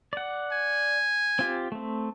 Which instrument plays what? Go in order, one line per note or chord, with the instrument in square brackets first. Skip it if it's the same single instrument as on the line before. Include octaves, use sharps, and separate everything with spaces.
[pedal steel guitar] D5 F#5
[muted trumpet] G#5
[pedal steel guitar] C4 F4 G4
A3 C4